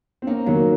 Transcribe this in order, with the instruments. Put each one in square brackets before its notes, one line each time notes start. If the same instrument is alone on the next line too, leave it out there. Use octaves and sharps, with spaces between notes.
[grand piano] C4
[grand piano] A#3 C#4 [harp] D#4
[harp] D#3 [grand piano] F#3 A#3